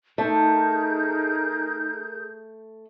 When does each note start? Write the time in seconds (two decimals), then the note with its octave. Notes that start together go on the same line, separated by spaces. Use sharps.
0.18 A3 D#4 G#4 A#4 G6